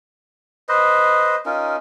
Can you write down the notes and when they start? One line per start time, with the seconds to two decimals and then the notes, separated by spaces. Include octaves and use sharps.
0.69 B4 C5 D#5
1.46 C#4 D#4 F4 A#4